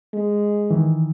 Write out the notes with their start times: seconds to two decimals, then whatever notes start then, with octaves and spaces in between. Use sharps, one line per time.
0.14 G#3
0.71 D#3 E3